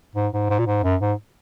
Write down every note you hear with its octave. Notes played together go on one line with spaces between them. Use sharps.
G#2
G#2
G#2
A#2
G#2
F#2
G#2